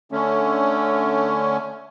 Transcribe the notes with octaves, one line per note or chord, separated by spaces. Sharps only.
D3 A3 C#4